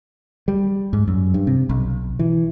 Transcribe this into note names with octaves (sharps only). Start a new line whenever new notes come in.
G3
G#2
F#2
G2
C3
B1
E3